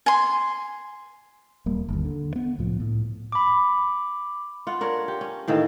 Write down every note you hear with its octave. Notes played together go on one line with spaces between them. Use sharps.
G#5 C6
D#1 G3 A#3
G1 D#2
D3
B3
C2 A2 F3
A2
B5 D6
F4 F#5
D4 A#4 C#5
G4
C#4
A2 D#3 E3 A#3